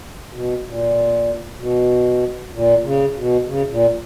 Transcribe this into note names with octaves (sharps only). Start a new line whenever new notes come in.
B2
A#2
B2
A#2
C#3
B2
C#3
A#2